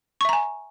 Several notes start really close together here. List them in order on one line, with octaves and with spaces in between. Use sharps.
C#6 E5 A#5 G#5